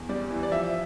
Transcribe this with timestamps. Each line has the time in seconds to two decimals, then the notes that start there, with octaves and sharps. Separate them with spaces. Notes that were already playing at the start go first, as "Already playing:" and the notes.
Already playing: E2
0.09 G3 D5
0.30 E3
0.43 D5
0.51 F3 E5